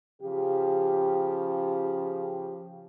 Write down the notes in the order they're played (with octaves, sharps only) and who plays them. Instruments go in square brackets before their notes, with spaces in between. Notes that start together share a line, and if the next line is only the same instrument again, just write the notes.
[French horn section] C#3 F3 G4